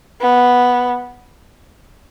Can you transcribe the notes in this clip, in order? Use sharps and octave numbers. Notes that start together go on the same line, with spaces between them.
B3